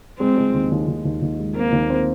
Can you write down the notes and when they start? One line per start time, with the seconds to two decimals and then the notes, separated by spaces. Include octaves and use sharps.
0.19 G#3 C4
0.37 G#3
0.54 D#2
0.71 D#2
0.88 D#2
1.05 D#2
1.22 D#2
1.39 G#3
1.56 A#3 C4
1.72 D#2
1.90 C4